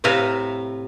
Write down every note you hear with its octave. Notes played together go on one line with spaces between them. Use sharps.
A2 C3 B4 E5 F5 A#5